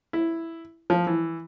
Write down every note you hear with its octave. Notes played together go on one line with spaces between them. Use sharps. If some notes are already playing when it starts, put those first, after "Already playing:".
E4
F3
E3